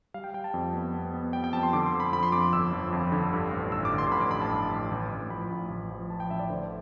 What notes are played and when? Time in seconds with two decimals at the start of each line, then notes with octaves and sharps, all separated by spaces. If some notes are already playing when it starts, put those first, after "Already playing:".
0.14 G3 F5
0.24 G5
0.34 G3 G5
0.44 A5
0.54 F2
0.74 B3
0.94 B3
1.14 B3
1.33 G3 G5
1.44 G5
1.53 F2 A5
1.63 C6
1.73 D3 D6
1.86 C6
1.93 F2
2.00 B5
2.13 F3 B5
2.23 C6
2.32 F2 D6
2.43 D6
2.53 G1 E6
2.73 F3
2.93 F2
3.12 D3
3.33 G2
3.52 A1
3.72 A1 E6
3.85 D6
3.92 D3
3.98 C6
4.11 A1 B5
4.21 D6
4.31 A1 B5
4.42 A5
4.52 G2
4.72 A1
4.91 A1
5.11 A1
5.30 F3 B5
5.50 A1
5.70 A1
5.90 F3
6.10 F3 A5
6.20 G5
6.30 A1 E5
6.40 D5
6.50 D3 C5